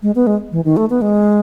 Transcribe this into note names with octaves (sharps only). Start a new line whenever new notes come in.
G#3
B3
G#3
E3
D#3
A3
B3
G#3